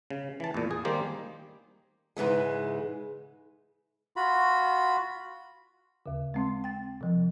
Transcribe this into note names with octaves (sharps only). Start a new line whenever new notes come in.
C#3
E3 A5
E2 A#2
G#4
D#3 G3 A#3 G4 C5
G#2 C#3 E3 G#3
F4 F#4 B5
D#2 C#3
G#3 C4 C6
G5 A6
C3 F3